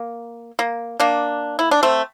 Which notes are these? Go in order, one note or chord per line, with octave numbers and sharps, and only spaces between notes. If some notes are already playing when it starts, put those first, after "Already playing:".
Already playing: A#3
A#3
A#3 D4
E4
D4
A3 C4